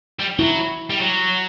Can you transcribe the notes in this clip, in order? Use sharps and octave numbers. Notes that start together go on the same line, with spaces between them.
G3
F#3 E4
G3
F#3